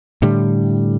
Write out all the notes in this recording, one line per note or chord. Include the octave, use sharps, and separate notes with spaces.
A2 D3 G3